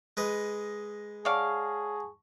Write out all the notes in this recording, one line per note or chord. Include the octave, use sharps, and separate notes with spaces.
G#3 B4 D#5
G#4 C#5 D5 F5 F#5 A5 C#6